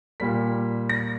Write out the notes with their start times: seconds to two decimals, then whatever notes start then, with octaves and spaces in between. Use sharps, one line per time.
0.20 A#2 G3 A#3 B6
0.89 A#6